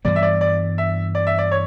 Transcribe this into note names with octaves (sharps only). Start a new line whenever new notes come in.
G2 E3 G3 B3 D5
E5
D5
D5
E5
D5
E5
D5
C#5